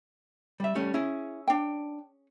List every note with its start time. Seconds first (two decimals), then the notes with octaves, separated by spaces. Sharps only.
0.60 G3 E5
0.75 G3 A3 C#4
0.94 C#4 E4 G#4
1.48 D4 G5